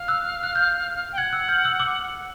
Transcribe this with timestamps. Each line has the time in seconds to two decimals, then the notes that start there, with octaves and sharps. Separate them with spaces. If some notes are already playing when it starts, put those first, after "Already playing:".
Already playing: F5
0.08 E6 F#6
0.43 F#6
0.55 F6 G6
1.12 G5
1.17 F#5 F#6 G#6
1.33 E6 F#6
1.48 F6 G6
1.64 E6 F#6
1.80 D6 E6